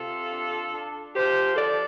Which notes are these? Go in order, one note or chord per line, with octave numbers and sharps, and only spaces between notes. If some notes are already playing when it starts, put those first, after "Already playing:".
Already playing: C3 F4 A4
D4
D4
F3 G4 C5
D4 A4 D5